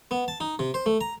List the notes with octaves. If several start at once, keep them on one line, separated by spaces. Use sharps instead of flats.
B3
A5
D#4
C3
C5
A3
A#5